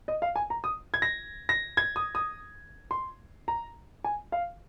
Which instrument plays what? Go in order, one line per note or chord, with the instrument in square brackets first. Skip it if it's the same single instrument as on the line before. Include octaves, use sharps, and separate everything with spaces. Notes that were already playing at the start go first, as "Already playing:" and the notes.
[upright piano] D#5
F5
G#5
A#5
D#6
G#6
A#6
A#6
G#6
D#6
D#6
C6
A#5
G#5
F5